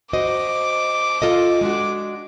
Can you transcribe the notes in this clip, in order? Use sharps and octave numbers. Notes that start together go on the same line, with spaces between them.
F#4 C5 D#5 D6
F4 A4 D#5
G#3 D4 F#4